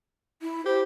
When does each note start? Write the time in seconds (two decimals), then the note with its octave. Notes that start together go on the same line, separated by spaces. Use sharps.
0.42 E4
0.66 G4 C5